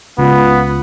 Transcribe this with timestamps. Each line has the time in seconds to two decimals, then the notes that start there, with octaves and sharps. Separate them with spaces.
0.18 C#2 B3 F4